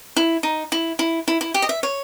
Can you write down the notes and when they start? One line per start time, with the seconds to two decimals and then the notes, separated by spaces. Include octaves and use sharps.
0.16 E4
0.43 D#4
0.72 E4
0.99 E4
1.28 E4
1.41 E4
1.54 G4
1.62 D#5
1.69 E5
1.83 C#5